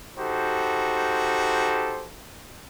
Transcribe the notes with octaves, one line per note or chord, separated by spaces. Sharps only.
D#4 F#4 G4 A4 C5